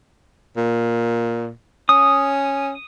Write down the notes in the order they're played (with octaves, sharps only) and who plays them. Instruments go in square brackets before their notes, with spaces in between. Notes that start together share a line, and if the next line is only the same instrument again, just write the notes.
[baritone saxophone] A#2
[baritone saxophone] C#4 [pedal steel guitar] D#6